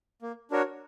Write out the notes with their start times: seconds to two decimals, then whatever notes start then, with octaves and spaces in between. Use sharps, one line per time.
0.22 A#3
0.51 D4 F#4 A#4 C#5